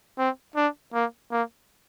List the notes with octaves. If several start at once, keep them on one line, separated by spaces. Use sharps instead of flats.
C4
D4
A#3
A#3